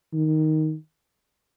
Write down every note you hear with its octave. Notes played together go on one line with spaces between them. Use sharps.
D#3